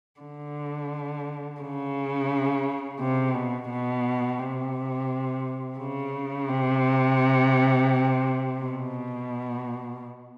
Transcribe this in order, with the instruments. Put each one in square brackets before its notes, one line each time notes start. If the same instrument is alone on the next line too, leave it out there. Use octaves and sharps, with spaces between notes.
[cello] D3
C#3
C3
B2
B2
C3
C#3
C3
B2